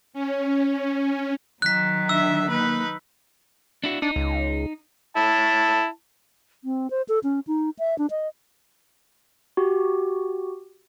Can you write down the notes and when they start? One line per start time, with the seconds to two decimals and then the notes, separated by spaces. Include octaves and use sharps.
0.13 C#4
1.62 D#3 F#3 F#6 B6
2.09 D4 E5 E6
2.50 A#3 D#4 B4
3.84 D4 E4 F#4
4.02 D4 D#4
4.16 C#2
5.16 E4 A5
6.64 C4
6.91 C5
7.09 A4
7.24 C#4
7.47 D#4
7.79 E5
7.98 D4
8.10 D#5
9.57 F#4 G4